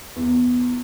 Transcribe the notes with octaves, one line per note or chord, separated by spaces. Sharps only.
E2